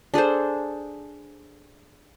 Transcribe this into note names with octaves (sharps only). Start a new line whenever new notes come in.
D4 G#4 A4 C5